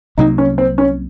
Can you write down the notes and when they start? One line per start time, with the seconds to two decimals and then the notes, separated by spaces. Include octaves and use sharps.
0.18 C2 C3 F#3 A#3 D#4
0.38 C#4
0.58 C4
0.78 C#4